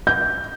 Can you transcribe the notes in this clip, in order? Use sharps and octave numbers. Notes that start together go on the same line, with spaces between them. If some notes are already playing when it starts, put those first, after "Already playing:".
G6